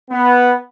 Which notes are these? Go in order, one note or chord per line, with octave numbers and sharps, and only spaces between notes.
B3